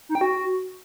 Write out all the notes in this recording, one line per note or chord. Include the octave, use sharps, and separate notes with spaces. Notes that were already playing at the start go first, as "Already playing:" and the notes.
D#4
G5
F#4